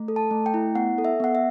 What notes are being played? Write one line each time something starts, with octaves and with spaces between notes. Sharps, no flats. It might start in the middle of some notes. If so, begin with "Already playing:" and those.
Already playing: A3
A4
A5
A3
G5
E4
B3 F#5
A4
E5
B3 F#5
E5